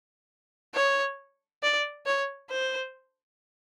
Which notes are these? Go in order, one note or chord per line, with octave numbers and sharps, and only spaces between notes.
C#5
D5
C#5
C5